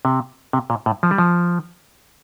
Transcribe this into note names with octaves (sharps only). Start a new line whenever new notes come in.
C3
C3
A#2
A2
F3
G3
F3